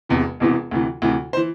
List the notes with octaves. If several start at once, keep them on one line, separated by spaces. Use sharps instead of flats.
E1 E2 C3 E3
E1 E2 C3 E3
D2 C3 E3
D2 C3 E3
C5
E3